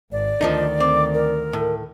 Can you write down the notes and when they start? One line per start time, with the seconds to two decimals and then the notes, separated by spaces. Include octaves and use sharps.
0.12 G#1 D5
0.41 D2 D#3 F3 D4 D#4
0.80 C4 D6
1.14 A#4
1.53 A2